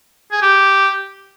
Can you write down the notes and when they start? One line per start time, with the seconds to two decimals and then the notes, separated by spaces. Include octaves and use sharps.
0.32 G#4
0.42 G4